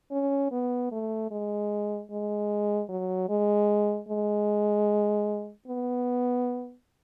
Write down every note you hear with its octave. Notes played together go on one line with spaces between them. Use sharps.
C#4
B3
A3
G#3
G#3
F#3
G#3
G#3
B3